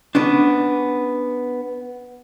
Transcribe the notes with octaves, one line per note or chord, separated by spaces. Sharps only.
B3 C#4 D4